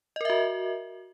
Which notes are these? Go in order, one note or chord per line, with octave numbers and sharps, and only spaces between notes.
F#4 A#4 D#5 E5